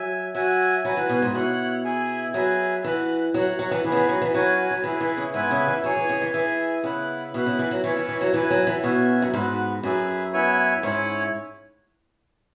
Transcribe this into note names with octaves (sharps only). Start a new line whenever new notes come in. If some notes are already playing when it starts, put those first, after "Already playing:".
Already playing: F#3 E5 G#5
F#3 F#4 E5 G#5
F#3 F#4 B4 G#5
E3
B2
G#2
B2 E4 C#5 F#5
E4 G#4 E5 G#5
F#3 G#4 B4 E5 G#5
E3 F#4 B4 F#5
F#3 F#4 C#5 F#5
F#3
E3
E3 B3 G#4 B4
C#3
E3
F#3
E3
F#3 C#4 F#4 B4 G#5
F#3
E3 E4 G#4 B4
E3
C#3
G#2 B3 E4 B4 E5 G#5
C#3
E3
F#3 G#4 C#5 G#5
E3
C#3
E3
E3 G#4 E5 G#5
C#3 B3 E4 B4 F#5
B2 E4 B4 F#5
C#3
E3
F#3
E3 C#4 E4 C#5
E3
E3
F#3
E3 E4 B4 G#5
F#3
E3
B2 C#4 F#4 E5
F#2
G#2 B3 F#4 B4
F#2 G#4 B4 E5
B3 E4 C#5 E5 G#5
G#2 C#4 E4 C#5